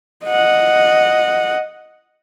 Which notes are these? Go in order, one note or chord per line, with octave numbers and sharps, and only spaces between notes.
D#5 F#5